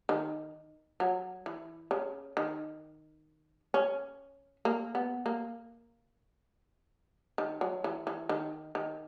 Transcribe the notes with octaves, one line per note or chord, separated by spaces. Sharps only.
D#3
F#3
E3
C#3
D#3
C#4
A#3
B3
A#3
D#3
F#3
E3
E3
D#3
D#3